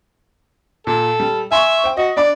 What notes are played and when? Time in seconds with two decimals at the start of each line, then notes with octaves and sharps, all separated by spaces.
0.87 A#2 A4
1.20 G3
1.52 E5 G#5 C6 C#6
1.84 C5 G5
1.97 F#4 D#5
2.17 D4 D5 B5 D6